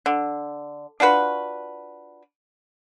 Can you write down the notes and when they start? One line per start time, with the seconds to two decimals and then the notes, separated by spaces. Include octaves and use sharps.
0.06 D3
1.00 D4 F4 F#4 B4